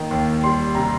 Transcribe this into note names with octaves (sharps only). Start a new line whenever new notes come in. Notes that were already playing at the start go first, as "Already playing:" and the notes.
Already playing: D#3 A#3
D#2
G3 C6
C3 A#5